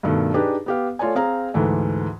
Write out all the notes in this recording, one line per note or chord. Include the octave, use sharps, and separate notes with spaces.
G2 B2 D#3 A3
D4 D#4 G4 G#4 B4
B3 G4 F5
A3 F4 C#5 D5 G#5
C4 G#4 F5 A#5
D2 G#2 E3 A3